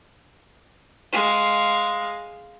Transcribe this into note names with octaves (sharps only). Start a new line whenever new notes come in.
G#3 F5